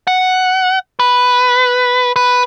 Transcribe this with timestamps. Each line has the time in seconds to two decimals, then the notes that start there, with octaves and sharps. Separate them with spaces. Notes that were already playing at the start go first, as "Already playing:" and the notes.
0.07 F#5
1.00 B4
2.16 B4